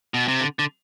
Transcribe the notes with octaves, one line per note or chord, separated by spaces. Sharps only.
B2
C3
D3
D3